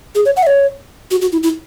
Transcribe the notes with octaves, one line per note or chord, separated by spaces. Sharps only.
G#4
C#5
F#5
E5
C#5
F#4
F#4
E4
E4